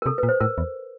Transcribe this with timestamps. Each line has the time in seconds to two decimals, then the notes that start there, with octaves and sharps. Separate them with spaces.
0.02 A#4
0.06 C3 A4
0.18 B4
0.23 A#2
0.29 C5
0.40 A2 A#4
0.58 E2